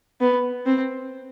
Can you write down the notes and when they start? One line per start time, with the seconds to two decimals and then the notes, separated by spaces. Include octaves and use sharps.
0.21 B3
0.66 C4